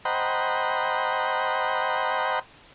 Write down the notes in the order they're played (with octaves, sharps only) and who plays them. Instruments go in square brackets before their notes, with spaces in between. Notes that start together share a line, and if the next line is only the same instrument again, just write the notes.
[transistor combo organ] C5 D#5 F#5 G5 A#5 B5